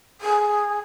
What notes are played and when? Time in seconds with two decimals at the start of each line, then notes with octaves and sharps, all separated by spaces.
0.21 G#4